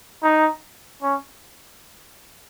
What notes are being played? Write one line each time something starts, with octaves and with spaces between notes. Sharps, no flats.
D#4
C#4